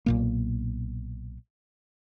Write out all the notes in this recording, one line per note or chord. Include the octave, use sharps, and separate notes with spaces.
B1 A#2 A#3